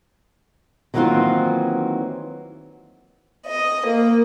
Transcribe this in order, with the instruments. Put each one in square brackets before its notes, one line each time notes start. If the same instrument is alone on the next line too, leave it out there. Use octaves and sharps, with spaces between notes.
[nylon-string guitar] D#3 E3 F#3 A#3 C4 F4
[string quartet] D#5
A#3